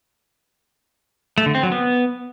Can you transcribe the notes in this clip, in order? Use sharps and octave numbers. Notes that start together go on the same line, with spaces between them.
A3
D3
C4
F#3
B3